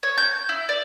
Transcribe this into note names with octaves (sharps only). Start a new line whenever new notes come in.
C#5
G6
E4
D5